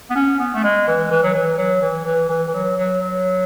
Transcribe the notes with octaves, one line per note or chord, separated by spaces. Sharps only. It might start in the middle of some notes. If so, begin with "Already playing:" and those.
B3
C#4
B3
A3
G#3
E3
E3
F#3
E3
F#3
E3
E3
E3
E3
F#3
F#3
F#3